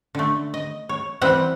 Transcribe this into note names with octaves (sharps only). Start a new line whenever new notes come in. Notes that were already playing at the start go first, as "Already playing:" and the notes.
D3 A3
D#5
C#5
E3 G3 C4 F#5